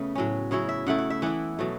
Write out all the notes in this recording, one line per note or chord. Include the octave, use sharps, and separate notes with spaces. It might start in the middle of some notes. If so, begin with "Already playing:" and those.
Already playing: C#3 A3 B3
A2 F#3 C#4
C#3 F#3 C#4 E4 C#5
E5
C#3 A3 E4 F#5
F#5
E5
E3 B3 E4 F#5
B2 F#3 A3